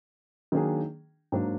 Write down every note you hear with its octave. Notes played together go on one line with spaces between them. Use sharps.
D#3 F#3 A#3 D4 G#4
G#2 F#3 A#3 D4